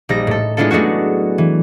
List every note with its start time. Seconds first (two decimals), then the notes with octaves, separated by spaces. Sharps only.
0.09 A#1 G3 D#4 A#6
0.27 A2 A4
0.57 G#3 B3 D4 E4 F4 A4
0.71 F#3 G#3 A3 D4 F#4
1.38 E3